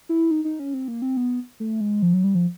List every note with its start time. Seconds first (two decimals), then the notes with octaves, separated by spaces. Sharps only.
0.09 E4
0.31 D#4
0.45 D#4
0.59 C#4
0.74 C4
0.88 A#3
1.02 C4
1.17 B3
1.60 A3
1.81 G#3
2.02 F3
2.14 F#3
2.24 G3
2.35 F3